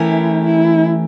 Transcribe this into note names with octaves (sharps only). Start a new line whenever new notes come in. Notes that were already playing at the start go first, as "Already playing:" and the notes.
Already playing: E3 A3 C#4 E4 G4 A#4
E4